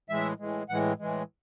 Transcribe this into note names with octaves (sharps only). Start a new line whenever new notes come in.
A2 E3 G#3 E5
A2 E3 G#3
A2 E3 G#3 F#5
A2 E3 G#3